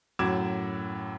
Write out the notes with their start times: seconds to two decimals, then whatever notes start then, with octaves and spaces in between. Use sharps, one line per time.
0.19 F#2 A2 F#4 D6 G#6 E7